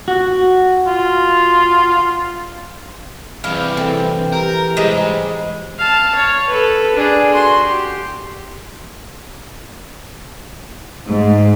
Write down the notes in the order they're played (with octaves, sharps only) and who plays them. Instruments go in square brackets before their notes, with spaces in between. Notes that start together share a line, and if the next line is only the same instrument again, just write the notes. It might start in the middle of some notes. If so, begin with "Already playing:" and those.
[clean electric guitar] F#4
[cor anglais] F4
[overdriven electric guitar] G2 C3 [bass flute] E3 [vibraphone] G#4 B5 [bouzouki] F5
[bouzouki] C4 [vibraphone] A4 G5
[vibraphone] G4 A#5 [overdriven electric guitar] A#4
[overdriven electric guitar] G#2 [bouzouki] G3 G#3 [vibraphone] C5 D#5
[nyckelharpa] F5 A5
C#5
A4 B4
D4 G#4
F#4 C6
G4
[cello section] G#2